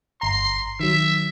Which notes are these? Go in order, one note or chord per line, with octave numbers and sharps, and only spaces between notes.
G1 A#5 C6
D#3 F#3 E5